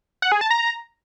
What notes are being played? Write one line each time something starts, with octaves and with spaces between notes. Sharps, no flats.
F#5
G#4
A5
A#5